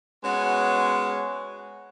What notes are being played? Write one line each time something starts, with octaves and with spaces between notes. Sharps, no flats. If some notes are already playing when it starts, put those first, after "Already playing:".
G#3 B3 C#4 F#4 B4 C#5